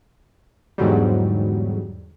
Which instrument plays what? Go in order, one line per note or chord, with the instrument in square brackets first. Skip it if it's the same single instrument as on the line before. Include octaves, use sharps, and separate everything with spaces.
[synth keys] E2 G#2 D3 F#3 G3